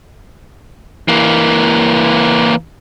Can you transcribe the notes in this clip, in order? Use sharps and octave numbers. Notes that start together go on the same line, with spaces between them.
E3 A#3